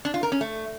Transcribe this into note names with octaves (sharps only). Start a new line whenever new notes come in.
D4
F4
A#4
C#4
A3